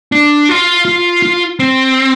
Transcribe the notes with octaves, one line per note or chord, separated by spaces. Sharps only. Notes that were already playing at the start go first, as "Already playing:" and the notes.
D4
F4
F4
F4
C4